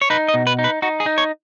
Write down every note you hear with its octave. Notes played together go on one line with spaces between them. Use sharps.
C#5
D#4 B4
D#5
B2
B4
D#4
B4
D#4 F#4
G#4
D#4
C#5